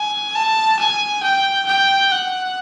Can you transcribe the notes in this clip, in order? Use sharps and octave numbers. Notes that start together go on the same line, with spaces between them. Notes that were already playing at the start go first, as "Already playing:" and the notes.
Already playing: G#5
A5
G#5
G5
G5
F#5